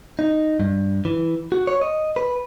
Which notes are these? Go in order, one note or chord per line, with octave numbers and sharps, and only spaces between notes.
D#4
G2
E3
F#4
C#5
D#5
B4